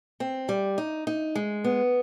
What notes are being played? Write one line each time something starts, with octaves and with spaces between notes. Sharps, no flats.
C4
G3
D#4
D#4
G#3
B3